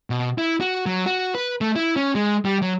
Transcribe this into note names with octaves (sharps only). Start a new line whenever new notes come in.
B2
E4
F#4
F#3
F#4
B4
A3
E4
C#4
G#3
G3
F#3